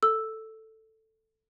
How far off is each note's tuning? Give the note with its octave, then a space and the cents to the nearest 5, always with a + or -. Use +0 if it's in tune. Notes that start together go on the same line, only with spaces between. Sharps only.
A4 +5 E6 +0